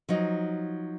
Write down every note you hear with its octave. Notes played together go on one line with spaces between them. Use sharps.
F3 F#3 D#4